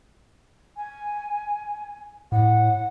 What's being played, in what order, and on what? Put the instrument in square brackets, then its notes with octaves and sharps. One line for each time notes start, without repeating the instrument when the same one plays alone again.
[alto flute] G#5
[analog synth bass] A2 [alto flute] F#5